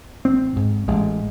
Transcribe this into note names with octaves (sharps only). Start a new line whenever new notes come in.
A1 C4
G#2
A1 G#3